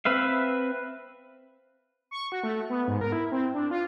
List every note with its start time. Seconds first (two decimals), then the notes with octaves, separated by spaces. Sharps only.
0.05 C4 B4 E5 F5
2.11 C#6
2.32 F#4
2.43 A3
2.70 B3
2.88 G#2
3.01 A#4
3.12 E4
3.32 C4
3.54 D4
3.71 F4